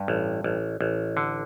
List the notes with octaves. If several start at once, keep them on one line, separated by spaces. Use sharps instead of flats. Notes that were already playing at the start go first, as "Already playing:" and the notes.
Already playing: G2
A1
A1
A1
D3